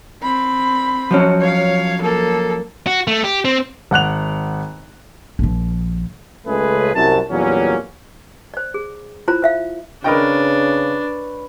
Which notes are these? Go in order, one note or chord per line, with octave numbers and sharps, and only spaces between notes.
C4 B5
F3 F#3 C#4
C#5 F5
A#3 A4
F#4
A3
G4
C4
G#1 F#5 F#6 F7
A#1 F3
C#2 C#3 G#3 A3 G#4 B4
C2 F#2 A5
E2 A#2 F#3 G3 A#3 C#4
C5 D5
G#4
E4 F4 C5 A#5
C5 E5 F5
C#3 D4 A#4 B4 C#5 D#5 G5